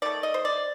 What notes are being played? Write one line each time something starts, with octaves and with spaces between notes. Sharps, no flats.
D#3 A3 D5
D#5
C5
D5